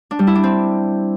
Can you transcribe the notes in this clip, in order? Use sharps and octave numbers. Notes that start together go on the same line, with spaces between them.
D4
G3
E4
D4
C4